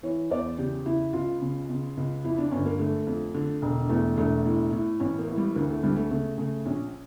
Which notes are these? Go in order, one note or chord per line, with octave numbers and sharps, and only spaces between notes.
E3 C#5
E2 D5
C#3 G4
C#3 E4
C#2 F4
C#3
C#3
C#2
F2 E4
D4
G1 C#4
A#3
D3 A3
F2
D3
E1
E2 A3
E1 A3
A2
A2
A1 C#4
A#3
A2
G3
D2 A#3
A3
D2 G3
A3
C#3 A3
C#3 A3
A#1 C#4